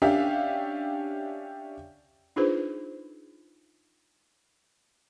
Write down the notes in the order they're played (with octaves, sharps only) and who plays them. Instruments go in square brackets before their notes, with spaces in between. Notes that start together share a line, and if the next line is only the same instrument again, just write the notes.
[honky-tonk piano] C#4 D4 G4 E5 F5
[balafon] D4 D#4 F4 G#4 B4 C5